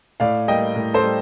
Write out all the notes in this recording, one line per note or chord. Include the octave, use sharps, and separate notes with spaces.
A2 D5 F5
G3 A#3 D#5 G5
A2
A4 C5
G3